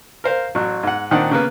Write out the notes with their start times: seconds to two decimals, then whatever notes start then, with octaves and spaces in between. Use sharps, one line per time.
0.24 A#4 C5 F5
0.55 A1 F#3
0.83 G#2 F#5
1.11 A#2 D#3 C4 D4 F#5
1.31 C#3 A#3 B3